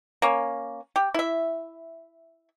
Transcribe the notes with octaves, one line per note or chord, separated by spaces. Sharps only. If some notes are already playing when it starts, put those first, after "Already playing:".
A#3 C#4
G4
E4 E5